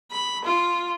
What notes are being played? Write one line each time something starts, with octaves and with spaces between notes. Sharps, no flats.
B5
F4